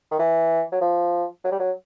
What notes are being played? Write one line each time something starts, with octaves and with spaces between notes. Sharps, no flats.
D#3
E3
F#3
F3
F#3
G3
F#3